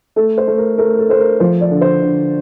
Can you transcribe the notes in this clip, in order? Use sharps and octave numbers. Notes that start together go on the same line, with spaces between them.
A3 A4
C5
A3
A#4
A3 A#4
A4
A3 C5
A#4
F3 C5
D5
D3
C5
D3